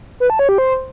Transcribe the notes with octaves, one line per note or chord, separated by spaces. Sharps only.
B4
A5
C#5
G4
C5